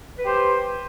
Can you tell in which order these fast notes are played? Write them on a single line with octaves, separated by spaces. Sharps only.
B4 G4 C5